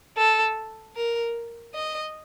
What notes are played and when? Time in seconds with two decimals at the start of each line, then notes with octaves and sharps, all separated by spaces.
0.18 A4
0.96 A#4
1.75 D#5